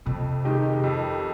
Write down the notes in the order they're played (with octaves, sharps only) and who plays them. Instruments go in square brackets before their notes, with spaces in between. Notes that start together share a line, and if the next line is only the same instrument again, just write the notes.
[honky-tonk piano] F2 [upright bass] C3
[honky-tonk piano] D#3 G#3 D#4 G4
F2